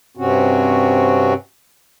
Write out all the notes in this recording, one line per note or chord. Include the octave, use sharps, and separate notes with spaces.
G2 C3 C4 C#4 F#4